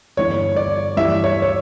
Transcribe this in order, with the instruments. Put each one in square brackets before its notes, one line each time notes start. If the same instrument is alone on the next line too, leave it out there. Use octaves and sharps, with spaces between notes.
[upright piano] G1 G2 E3 [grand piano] C#5
[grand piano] D5
[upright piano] G2 E3 G3 [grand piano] E5
[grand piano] C#5
C#5